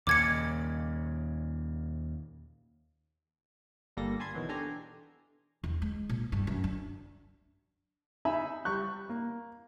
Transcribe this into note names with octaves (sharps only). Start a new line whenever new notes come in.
D#2 A#2 C#3 D6 G#6 C#7
G1 D3 G3 A#3 A4 A#6
G#5 A5 B5 C6 G#6
B2 D#3 E3 F#3
D4 G4 A4 G#5 A#5 C6
E2
G#3
A#2
G2
F#2
D4
D#4 E5 G#5 B5
G3 C#6 F#6
A#3